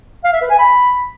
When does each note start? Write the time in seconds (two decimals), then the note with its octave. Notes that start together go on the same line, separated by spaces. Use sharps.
0.24 F5
0.33 E5
0.42 B4
0.50 G#5
0.59 B5